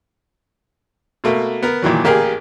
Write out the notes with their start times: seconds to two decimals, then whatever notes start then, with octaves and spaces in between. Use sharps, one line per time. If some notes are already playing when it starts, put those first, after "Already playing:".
1.24 B2 A3 A#3
1.63 B3 A#4
1.82 A#2 D#3 E3 F#3
2.04 A1 A#3 G4 G#4 A#4